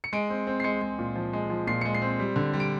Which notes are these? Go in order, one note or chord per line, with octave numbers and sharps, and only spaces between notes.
C#7
G#3 D7
C4
C4
C7
G#3 C#7
G#3
A#2
F3
G#3
F3
A#2 C7
G#3 C#7
C7
C4
G3
D3
G3
D7